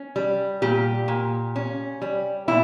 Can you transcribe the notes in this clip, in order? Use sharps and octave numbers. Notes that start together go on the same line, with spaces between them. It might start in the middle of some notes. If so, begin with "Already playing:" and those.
Already playing: C#4
G3
A#2 G4
A#2
C#4
G3
A#2 E4